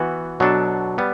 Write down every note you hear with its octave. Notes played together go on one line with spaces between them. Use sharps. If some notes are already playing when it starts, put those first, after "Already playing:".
Already playing: E3 B3 F#4
B2 F#3 B3 D4 A4
G3 B3